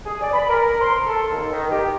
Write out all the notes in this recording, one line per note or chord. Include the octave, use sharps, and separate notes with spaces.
G#4
D5
B5
A#4
C6
A4
D#2
D#3
G4